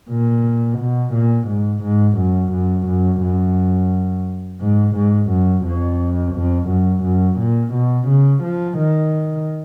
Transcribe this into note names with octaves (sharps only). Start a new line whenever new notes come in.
A#2
B2
A#2
G#2
G#2
F#2
F#2
F#2
F#2
G#2
G#2
F#2
F2
F2
F#2
F#2
A#2
B2
C#3
F3
D#3